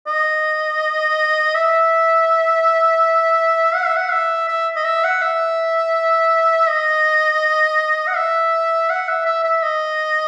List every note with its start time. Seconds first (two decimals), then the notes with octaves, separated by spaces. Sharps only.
0.07 D#5
1.54 E5
3.74 F#5
3.85 E5
3.96 F#5
4.11 E5
4.48 E5
4.76 D#5
4.84 E5
5.04 F#5
5.21 E5
6.68 D#5
8.07 F#5
8.16 E5
8.90 F#5
9.08 E5
9.25 E5
9.43 E5
9.62 D#5